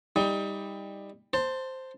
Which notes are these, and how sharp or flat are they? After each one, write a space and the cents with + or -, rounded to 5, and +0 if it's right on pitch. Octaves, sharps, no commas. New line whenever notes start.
G3 +20 D#4 +30
C5 +0 A5 +25